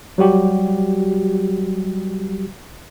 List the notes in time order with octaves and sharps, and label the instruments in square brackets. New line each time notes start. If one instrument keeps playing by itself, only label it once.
[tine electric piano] F#3 G3 F#4 G4